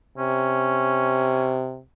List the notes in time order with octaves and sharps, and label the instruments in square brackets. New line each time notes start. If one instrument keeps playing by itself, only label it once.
[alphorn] C3 [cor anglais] C#4